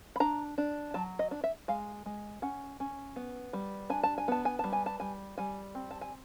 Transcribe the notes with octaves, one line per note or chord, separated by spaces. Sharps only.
B5
D4 A#5
D4
F#3 A5
D#5
D4
E5
G#3 F5
G#3
C#4 F#5
C#4
B3
G3
D4 G#5
A5
G#5
B3 A5
G#5
G3 A5
G#5
A5
G3 G#5
G3 G#5
C4
A5
G#5